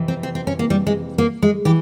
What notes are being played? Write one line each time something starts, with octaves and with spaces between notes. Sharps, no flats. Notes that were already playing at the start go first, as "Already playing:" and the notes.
Already playing: F2 C3 E3
C4
C4
C4
C#4
A#3
G3
G#3
A#3
G#3
E3 G4